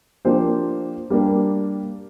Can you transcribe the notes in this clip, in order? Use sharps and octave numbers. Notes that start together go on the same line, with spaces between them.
F3 A#3 D4 G4 C5
G3 A#3 D4 G4